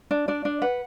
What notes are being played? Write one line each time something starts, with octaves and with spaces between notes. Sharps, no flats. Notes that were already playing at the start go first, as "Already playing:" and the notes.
D4
D4 D5
D4
B4 F#5